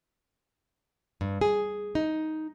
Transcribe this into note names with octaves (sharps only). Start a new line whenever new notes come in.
G2
G#4
D#4